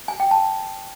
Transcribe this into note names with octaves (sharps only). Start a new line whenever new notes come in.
G#5
G5
A5